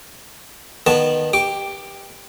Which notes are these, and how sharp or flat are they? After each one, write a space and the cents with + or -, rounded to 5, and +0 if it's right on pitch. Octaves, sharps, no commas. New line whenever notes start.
D#3 -20 B3 -25 A5 +0
G4 +10 D6 +0